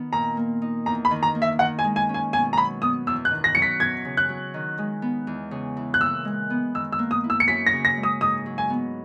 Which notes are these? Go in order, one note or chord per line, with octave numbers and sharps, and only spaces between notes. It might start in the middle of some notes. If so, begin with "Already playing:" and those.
Already playing: D#3 B3
A#2 A#5
A#3
D#4
E2 A#5
B5
D#3
A#5
A#3
E5
D#3 F#5
G#5
G#3
G#5
C#4
G#5
B2 G#5
A#5
F#3 B5
B3 D#6
E2 E6
F#6
D#3
A#6
F#3 C#7
B6
E2 G#6
C#3
F#6
F#3
D#3
G#3
B3
E2
C#3
E3
F#6
A#2 E6
G#3
B3
D#3 E6
E6
A#3
D#6
E4
E6
C#7
F#2 B6
A#6
C#3
A#6
G#3
D#6
G#2 D#6
F#3
G#5
B3